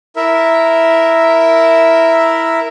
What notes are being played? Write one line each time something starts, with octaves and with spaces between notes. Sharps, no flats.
E4 A#4 E5